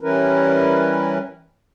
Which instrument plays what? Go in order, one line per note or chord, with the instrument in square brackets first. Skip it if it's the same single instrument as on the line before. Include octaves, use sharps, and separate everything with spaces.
[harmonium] E3 G3 C#4 E4 A#4 B4